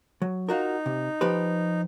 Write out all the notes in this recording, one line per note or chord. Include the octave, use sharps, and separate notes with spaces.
F#3
D#4 F4 F#4 A#4
C3
F3 G4 B4